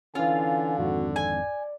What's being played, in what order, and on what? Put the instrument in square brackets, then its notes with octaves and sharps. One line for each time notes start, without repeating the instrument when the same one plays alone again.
[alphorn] D3 [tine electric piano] E3 C#4 [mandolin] F4 [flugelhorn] G#5
[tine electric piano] G#1 F2 G#2 [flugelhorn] F#4
[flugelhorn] D5 [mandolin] G#5